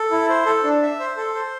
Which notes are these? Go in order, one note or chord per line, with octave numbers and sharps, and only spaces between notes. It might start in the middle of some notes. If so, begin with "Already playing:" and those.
Already playing: A4
E4
C5
A4
D4
E5
C5
A4
C5